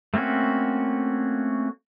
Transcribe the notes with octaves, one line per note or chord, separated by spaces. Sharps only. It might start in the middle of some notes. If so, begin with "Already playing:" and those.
A3 A#3 C4 C#4 F#4